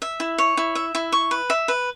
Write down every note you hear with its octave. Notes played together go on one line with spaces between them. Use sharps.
E5
E4
C#5
E4
E5
E4
C#6
B4
E5
B4